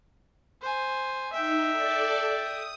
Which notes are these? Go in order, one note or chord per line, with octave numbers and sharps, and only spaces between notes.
C5 G#5
D#4 E5 G5
A4 D5
D#6